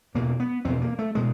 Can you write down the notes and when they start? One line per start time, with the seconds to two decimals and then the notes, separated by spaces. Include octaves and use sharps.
0.14 E2 B2 A#3
0.40 B3
0.65 E2 B2 C4
0.82 A#3
0.99 A3
1.15 B2 G#3